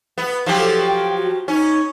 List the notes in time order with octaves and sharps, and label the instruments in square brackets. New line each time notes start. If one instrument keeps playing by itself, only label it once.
[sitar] B3
F3 F#3 G4
[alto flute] A4
G5
F#4
[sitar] C#4 [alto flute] D#4